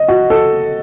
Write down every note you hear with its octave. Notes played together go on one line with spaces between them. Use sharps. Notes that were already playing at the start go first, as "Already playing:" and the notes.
Already playing: D#5
F#4
A4